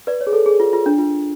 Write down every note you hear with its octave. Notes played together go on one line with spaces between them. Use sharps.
B4 D5
C#5
G#4
A4
G#4
F4
F4
D4
F4